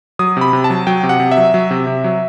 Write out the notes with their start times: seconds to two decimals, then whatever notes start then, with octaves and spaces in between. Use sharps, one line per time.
0.19 F#3 D#6
0.37 C3 B5
0.53 C3
0.64 A5
0.70 F#3
0.87 F#3 G5
1.03 C3
1.09 F#5
1.20 C3
1.31 E5
1.37 F#3
1.54 F#3
1.71 C3
1.87 C3
2.04 F#3